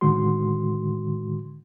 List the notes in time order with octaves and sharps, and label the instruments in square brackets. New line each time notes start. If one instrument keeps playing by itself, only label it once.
[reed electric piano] A2 D3 D#3 G#3 F#4 C6